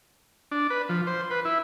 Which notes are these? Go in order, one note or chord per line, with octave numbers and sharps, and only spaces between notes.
D4
B4
F3
C5
B4
E4